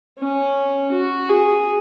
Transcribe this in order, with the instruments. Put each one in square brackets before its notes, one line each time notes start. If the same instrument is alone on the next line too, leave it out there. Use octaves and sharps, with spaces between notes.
[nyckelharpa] C#4
F#4
G#4